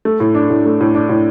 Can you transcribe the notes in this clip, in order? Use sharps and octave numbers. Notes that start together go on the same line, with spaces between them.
A3
A2
D4
A2
A3
A2
D4
A2